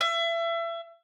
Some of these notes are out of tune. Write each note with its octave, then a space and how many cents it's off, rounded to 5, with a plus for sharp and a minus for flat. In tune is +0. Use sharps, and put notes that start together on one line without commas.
E5 +30